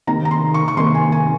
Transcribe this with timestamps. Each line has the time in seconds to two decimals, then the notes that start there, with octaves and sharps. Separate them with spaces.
0.07 C3 D#3 A#3 A#5
0.25 A#5
0.31 C6
0.54 C#6
0.68 C#6
0.77 C3 D#3 A#3 C6
0.95 G#5
1.12 G#5